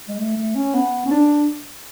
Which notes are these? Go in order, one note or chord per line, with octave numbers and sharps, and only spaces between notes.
G#3
A3
A3
C#4
B3
C#4
D4